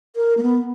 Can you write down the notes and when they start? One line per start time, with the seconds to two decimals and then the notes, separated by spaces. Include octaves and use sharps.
0.16 A#4
0.37 A#3
0.42 B3